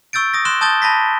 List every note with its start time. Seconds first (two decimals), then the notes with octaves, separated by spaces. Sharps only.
0.13 C#6 E6 G6 A6 D7
0.34 D#6 A#6
0.45 C6 F#6 E7 G7
0.61 A5 D#6 G6 A6 G7
0.82 A5 B5 A#6 B6